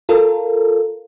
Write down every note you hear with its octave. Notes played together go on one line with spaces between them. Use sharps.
F4 A4 A#4